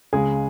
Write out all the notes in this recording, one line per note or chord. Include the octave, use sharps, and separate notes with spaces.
C#2 C#3 G#3 G#4